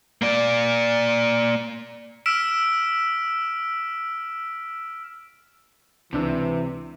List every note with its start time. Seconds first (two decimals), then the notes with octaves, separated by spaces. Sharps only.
0.22 A#3 D5
2.26 E6 F6 B6 D7 E7
6.13 C#2 C3 E3 D4 E6